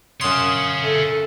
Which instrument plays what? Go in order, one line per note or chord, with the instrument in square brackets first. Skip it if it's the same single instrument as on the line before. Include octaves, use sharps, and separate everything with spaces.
[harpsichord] F#2 C6 [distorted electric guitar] C#5 F5 [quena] D#6
[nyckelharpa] A4 [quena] E5